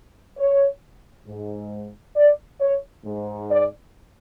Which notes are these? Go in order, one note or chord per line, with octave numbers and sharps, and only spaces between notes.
C#5
G#2
D5
C#5
G#2
D5